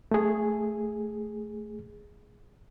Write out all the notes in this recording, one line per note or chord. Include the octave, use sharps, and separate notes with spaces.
A3 G#4